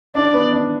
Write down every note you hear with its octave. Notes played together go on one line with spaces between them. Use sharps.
D4 D5
B3
D4